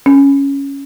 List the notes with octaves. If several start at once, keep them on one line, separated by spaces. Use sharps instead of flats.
C#4